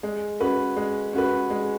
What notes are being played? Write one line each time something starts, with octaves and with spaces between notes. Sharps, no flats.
G#3
C#4 F#4 B4
G#3
C#4 F#4 B4
G#3